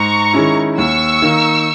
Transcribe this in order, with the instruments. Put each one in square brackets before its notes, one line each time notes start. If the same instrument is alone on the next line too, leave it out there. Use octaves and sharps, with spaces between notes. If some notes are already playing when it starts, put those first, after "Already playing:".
Already playing: [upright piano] G#2 [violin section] A#5 C#6
[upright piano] D#3 G#3 C#4 E4
[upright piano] D#2 [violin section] C#6 E6
[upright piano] D#3 A#3